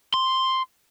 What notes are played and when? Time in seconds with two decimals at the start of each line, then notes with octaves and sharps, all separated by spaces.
0.14 C6